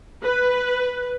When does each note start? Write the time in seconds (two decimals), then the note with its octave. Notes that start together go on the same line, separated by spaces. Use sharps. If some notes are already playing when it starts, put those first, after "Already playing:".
0.23 B4